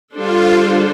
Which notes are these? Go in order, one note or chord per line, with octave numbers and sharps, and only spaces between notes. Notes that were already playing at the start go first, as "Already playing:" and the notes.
D3 G3 D4 F4 A4 C5